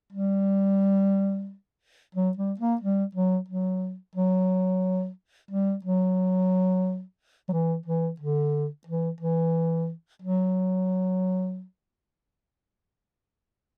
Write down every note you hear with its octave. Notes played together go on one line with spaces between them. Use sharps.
G3
F#3
G3
A#3
G3
F#3
F#3
F#3
G3
F#3
F#3
E3
E3
D3
E3
E3
F#3